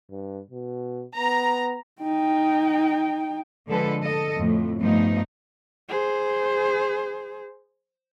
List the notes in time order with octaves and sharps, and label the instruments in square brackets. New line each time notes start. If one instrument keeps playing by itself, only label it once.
[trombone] G2
B2
[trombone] B3 [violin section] A#5
[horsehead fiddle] D#4 G5
[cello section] D3 F3 G#3 A4 B4
A4 D#5
F2 A2
G2 F3 A3 B3 D#4
[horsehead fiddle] G#4 C5